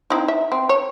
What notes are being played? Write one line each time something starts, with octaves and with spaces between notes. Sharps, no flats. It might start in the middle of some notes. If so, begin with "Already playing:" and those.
C4 D#4 E4
E5
C4
C#5